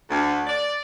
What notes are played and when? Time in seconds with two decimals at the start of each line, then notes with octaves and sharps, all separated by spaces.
0.10 D2
0.47 D5